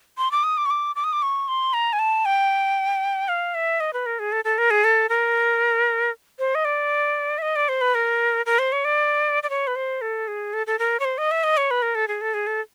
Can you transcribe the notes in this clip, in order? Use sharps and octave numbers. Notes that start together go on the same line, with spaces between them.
C6
D6
D#6
D6
C#6
D6
D6
D#6
D6
C#6
C6
A#5
G#5
A5
G5
F5
E5
D#5
B4
A#4
G#4
A4
A4
A#4
G#4
A4
A#4
C5
D#5
D5
E5
D#5
D5
C5
B4
A#4
A#4
C5
C#5
D5
D5
C#5
B4
C5
A4
G#4
A4
A4
A#4
C#5
C5
D#5
E5
D#5
C#5
B4
A#4
A4
G#4
A4
G#4
A4